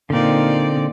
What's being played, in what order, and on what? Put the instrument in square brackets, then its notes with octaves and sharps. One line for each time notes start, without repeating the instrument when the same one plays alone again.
[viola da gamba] A#2 D#4 D5 [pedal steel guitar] D3 C4